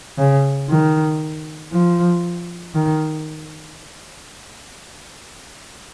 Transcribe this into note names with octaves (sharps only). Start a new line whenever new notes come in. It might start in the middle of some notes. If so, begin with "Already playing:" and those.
C#3
D#3
F3
D#3